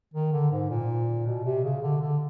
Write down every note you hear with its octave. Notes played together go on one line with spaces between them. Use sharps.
D#3
D3
G#2
A#2
B2
C3
C#3
D3
D3